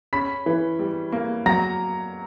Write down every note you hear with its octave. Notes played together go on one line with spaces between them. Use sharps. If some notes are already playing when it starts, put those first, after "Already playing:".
C#4 B5 B6
E3
G3
A#3
F#3 A#5 A#6